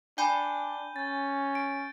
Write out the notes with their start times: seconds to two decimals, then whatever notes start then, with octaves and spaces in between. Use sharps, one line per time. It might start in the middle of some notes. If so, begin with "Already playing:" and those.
0.18 D4 G5 G#5 B5 G6 D#7 G7
0.96 C#4 G6 A6
1.55 D7